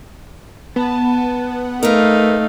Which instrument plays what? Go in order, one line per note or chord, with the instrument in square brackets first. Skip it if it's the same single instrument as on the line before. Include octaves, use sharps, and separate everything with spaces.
[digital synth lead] B3 [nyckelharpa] A5
[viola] A3 [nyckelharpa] D#4 F5 [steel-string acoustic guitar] A#4 B4